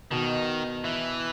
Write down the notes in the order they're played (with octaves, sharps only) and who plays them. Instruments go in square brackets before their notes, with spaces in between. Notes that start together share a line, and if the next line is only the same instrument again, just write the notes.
[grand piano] B2 [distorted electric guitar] D#3
[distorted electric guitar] E3